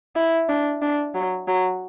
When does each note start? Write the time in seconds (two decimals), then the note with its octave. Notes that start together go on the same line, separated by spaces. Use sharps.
0.16 E4
0.49 D4
0.82 D4
1.15 F#3
1.48 F#3